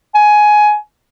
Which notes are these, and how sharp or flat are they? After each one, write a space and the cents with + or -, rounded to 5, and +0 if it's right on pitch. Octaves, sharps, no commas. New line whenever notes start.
G#5 +15